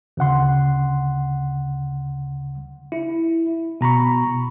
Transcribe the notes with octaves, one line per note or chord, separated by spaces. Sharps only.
D2 C#3 F#5 C6
E4
B2 A#5 B5 C#6